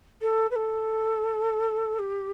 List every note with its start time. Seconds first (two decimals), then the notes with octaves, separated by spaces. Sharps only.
0.21 A4
0.51 B4
0.55 A4
1.99 G4